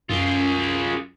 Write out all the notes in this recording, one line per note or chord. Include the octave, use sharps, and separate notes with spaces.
F#2 F4 G#4